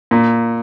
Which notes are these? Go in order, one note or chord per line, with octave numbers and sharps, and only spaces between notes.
A#2